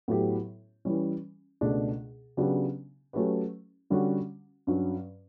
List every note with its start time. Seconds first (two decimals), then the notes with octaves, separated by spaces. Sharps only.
0.08 A2 F#3 B3 E4 G4
0.85 E3 G3 C#4
1.61 C#2 B2 A3 D4
2.37 C#3 F#3 B3 D4 G4
3.13 F#3 A3 C#4 G4 B4
3.90 D3 G3 C#4 F#4
4.67 G2 F#3 C#4